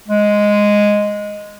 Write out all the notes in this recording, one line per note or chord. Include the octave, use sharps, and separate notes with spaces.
G#3